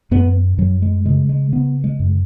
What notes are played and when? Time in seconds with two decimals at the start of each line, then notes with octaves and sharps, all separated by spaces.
0.11 F#2 B3
0.58 F#2 F#3
0.82 G#3
1.06 C#3 G#3
1.29 G#3
1.52 C#3 B3
1.84 G#3
1.99 F#2